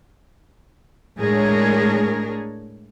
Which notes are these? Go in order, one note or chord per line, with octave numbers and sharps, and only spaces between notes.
A2 G#3 D4 G#4 A#4 C#5